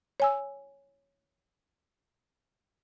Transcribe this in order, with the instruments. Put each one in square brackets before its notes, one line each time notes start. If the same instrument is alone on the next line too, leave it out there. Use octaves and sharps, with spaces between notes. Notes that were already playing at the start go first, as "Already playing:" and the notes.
[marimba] C#5 G#5 E6